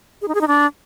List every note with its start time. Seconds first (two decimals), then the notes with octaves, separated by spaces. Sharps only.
0.22 G#4
0.28 D#4
0.35 G#4
0.41 D#4
0.48 D4